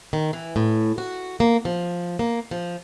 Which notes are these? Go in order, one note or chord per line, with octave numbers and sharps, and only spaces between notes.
D#3
E3
A2
F#4
A#3
F3
A#3
F3